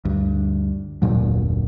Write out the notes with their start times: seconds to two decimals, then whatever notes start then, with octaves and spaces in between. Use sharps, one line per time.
0.05 D2 G2
1.02 F1 D2 A#2 F#3